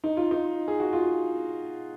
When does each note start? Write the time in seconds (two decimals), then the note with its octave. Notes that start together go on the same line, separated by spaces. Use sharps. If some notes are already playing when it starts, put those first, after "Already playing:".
0.04 D#4
0.17 F4
0.31 D#4
0.68 G#4
0.80 F#4
0.93 F4